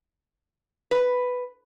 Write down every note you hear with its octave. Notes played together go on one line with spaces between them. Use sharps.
B4